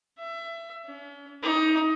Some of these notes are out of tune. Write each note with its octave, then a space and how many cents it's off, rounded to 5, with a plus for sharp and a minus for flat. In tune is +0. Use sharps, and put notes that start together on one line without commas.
E5 +25
C#4 +45
D#4 +20